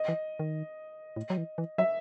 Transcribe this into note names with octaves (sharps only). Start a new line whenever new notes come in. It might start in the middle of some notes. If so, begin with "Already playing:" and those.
Already playing: D#5
E3
D#3
A2
F#3
E3
E3
F#3 E5